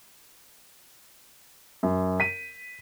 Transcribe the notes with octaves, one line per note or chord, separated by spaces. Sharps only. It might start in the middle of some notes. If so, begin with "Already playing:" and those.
F#2
B6 D#7